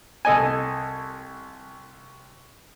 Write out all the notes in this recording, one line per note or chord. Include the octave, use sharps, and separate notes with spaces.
C2 A4 D#5 G#5